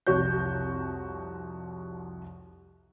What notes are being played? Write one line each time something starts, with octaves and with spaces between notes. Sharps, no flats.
C2 F2 C3 F#4 C#5 G6